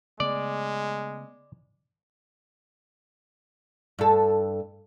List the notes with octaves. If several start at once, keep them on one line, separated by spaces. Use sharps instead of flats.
C#3 G#3 A3 B3 D5
G2 A4